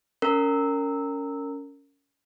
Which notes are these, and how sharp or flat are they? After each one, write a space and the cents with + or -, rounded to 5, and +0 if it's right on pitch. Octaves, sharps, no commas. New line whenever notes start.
C#4 +20 A#4 -20